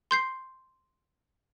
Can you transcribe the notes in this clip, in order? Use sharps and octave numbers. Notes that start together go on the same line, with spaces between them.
C6 G6 C7